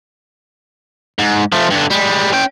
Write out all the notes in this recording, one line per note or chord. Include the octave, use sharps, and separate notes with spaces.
G#2
F3 A3
G2 D3
G3 G#3
C#4 G5